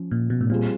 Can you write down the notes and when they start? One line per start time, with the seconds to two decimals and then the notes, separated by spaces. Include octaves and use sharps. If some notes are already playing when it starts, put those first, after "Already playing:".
Already playing: F3 C#4
0.11 A#2
0.30 B2
0.41 A2
0.50 A#2 G3 C4 F4 G#4